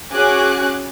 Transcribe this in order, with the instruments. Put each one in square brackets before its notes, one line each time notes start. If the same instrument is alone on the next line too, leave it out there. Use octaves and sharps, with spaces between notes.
[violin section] C#4 F#4 G#4 G#5 D6 F#6